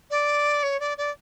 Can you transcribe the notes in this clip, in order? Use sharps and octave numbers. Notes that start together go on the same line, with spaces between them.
D5
C#5
D5
D5